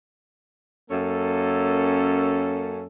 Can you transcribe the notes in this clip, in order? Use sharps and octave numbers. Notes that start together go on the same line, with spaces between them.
F#2 A#3 C#4 A4